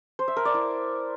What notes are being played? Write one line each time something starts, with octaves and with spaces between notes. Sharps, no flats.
C5
E5
A#4
D5
E4